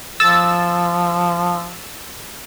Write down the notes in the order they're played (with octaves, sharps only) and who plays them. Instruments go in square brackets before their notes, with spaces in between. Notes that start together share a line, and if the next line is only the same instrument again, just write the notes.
[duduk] F3 [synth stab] E6 A6